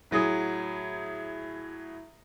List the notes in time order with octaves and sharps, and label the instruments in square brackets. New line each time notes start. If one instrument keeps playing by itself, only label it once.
[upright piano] A2 F#3 G#4 D#6